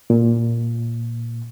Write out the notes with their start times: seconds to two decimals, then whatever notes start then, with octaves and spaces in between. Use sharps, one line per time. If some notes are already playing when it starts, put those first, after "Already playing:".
0.10 A#2